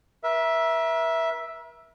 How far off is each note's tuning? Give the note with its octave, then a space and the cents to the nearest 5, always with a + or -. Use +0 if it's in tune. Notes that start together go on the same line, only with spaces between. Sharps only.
A#4 +45 E5 +0